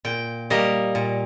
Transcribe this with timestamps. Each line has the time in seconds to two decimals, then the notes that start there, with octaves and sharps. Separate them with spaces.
0.05 A#2 G5
0.50 G3 A#3 D#5
0.95 A#2